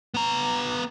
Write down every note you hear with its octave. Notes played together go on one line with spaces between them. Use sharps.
B3 A#5